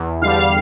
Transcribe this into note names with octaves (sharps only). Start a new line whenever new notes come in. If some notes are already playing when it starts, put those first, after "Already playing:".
Already playing: E2
D3 G3 F5